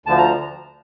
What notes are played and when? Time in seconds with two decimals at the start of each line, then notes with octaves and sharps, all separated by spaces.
0.06 D2 D3 F3 A5
0.18 A#5